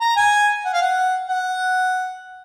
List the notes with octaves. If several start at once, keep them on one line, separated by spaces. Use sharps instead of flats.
A#5
G#5
F#5
F5
F#5
F#5